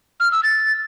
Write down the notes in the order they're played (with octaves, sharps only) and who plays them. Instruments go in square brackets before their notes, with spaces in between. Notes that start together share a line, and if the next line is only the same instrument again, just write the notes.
[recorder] F6
E6
A6